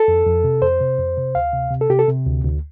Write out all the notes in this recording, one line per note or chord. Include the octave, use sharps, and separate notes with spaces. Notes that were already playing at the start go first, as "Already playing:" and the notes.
Already playing: A4
F2
F2
C3
F2 C5
C3
F2
C3
D2 F5
C3
C3
A4
C3 G4
A4
C3
D2
D2